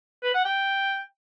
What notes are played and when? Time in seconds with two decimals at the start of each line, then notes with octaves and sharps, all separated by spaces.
0.23 B4
0.34 F#5
0.45 G5